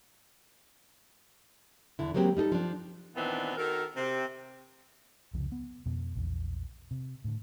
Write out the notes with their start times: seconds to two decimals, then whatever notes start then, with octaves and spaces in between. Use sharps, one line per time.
1.99 E2 D3 E4
2.14 F#3 G#3 A#3 C4 G4
2.37 G3 D#4 G#4 A4
2.52 F3 D4
3.16 A#2 D#3 E3 B3 C4 D4
3.57 D#3 F#4 A4 A#4
3.96 C3 C4
5.33 C2 F2 C#3 F3
5.52 B3
5.86 F2 B2
6.15 A#1 E2
6.91 C3
7.24 A2 D3